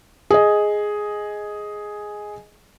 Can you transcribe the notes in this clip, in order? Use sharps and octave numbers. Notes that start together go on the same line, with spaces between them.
G#4 D#5